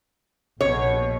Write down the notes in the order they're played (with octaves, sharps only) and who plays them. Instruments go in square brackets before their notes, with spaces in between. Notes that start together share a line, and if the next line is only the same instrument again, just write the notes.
[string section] A#1 B2 [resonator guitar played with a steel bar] C#5